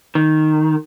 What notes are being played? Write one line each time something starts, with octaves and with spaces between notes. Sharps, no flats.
D#3